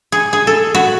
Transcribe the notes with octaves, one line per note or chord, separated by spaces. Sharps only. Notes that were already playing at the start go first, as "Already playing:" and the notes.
G#4
G#4
A4
F#4